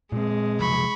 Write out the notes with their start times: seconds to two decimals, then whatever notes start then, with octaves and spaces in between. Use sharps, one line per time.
0.12 A#2 G#3 C4
0.59 C3 F3 F#3 B5 C#6